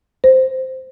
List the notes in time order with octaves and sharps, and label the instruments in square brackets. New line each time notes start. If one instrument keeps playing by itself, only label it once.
[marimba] C5